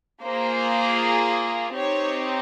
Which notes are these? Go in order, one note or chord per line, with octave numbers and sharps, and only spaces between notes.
A#3 F4 G#4 C5
C4 D#4 G4 C#5